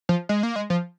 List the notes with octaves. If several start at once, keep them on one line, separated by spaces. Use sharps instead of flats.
F3
G#3
A#3
G#3
F3